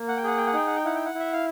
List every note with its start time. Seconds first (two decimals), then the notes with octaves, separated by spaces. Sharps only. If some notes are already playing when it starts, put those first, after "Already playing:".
Already playing: A#3
0.08 F#5
0.17 G5
0.24 G#4 F#5
0.37 G5
0.47 F#5
0.54 D#4 G5
0.67 F#5
0.76 G5
0.84 E4 F#5
0.95 G5
1.06 F#5
1.15 E4 E5
1.33 F5